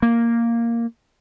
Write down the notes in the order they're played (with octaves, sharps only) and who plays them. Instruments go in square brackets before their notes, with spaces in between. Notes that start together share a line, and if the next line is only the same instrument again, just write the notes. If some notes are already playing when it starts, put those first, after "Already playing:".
[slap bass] A#3